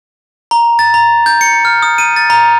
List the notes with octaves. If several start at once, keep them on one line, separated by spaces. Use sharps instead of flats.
A#5
A6
A#5
G6
C#7
F6
D#6
D#7
A6
A#5